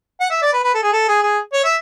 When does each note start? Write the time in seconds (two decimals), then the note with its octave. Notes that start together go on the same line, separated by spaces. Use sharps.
0.20 F#5
0.31 E5
0.42 D5
0.53 B4
0.64 B4
0.74 A4
0.83 G#4
0.93 A4
1.08 G#4
1.23 G#4
1.53 C#5
1.64 E5